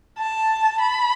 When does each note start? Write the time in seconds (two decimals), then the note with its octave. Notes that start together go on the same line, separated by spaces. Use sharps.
0.20 A5
0.82 B5